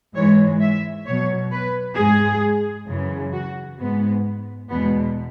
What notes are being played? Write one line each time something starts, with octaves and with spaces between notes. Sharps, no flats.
G#2 E3 G#3 C#5
E5
B2 F#3 C#5
B4
G#2 G#3 G#4
F#2 C#3 E3
F#4
G#2 G#3 B3
E2 B2 G#3 B3